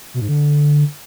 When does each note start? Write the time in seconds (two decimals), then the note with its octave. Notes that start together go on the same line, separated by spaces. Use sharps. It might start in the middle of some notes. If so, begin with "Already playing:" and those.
0.14 B2
0.21 G#2
0.29 D3